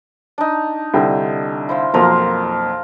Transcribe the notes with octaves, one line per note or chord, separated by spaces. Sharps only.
D4 D#4
C2 D3 G5
E4 C5 F5
B1 F2 A#3 F4 A#4 C5